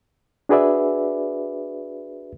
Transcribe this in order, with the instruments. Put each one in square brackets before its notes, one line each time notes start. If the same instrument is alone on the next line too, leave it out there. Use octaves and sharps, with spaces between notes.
[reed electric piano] D4 F#4 G#4 B4 D5 E5